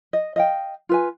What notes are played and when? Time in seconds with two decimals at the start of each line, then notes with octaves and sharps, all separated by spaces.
0.13 D#5
0.36 D#5 F5 G5
0.89 F4 B4 G#5